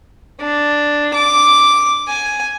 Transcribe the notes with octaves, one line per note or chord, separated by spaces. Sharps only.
D4
D6
G#5